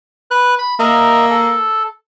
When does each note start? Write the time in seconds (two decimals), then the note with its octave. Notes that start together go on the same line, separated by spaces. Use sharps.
0.31 B4 F#6
0.58 B5
0.80 A#3 A#4 D#5 E5
1.30 A4